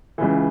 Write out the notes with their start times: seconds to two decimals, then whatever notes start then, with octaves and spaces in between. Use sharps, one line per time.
0.18 C#2 C#3 E3